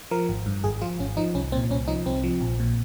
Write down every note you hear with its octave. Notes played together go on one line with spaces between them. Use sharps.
F3 A#4
G#1
G2
G#1 G#4
F3 F4
G#1 C#4
F3 D#4
C2 C#4
A#2 C4
C2 C#4
F3 D#4
C2 C4
F3
A#1
A#2